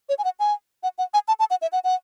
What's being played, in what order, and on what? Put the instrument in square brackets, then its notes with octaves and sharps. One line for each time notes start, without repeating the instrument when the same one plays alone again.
[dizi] C#5
G#5
F#5
G#5
F#5
F#5
G#5
A5
A5
F#5
E5
F#5
F#5